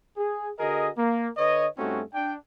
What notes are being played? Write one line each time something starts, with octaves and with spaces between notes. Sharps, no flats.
G#4
D3 F#4 G#4 A#4 D#5
A#3
D3 B4 C#5 D#5
G2 A3 C4 C#4 D#4 F#4
D4 G5